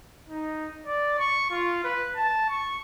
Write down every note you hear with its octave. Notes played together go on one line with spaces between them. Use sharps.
D#4
D5
C#6
F4
B4
A5
C#6